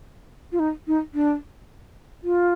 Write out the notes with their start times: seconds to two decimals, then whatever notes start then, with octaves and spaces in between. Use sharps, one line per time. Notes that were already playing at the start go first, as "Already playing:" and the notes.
0.52 F4
0.59 D#4
0.87 D#4
1.14 D4
2.24 F4